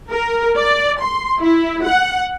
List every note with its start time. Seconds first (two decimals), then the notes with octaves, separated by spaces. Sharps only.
0.11 A#4
0.57 D5
1.03 C6
1.41 E4
1.86 F#5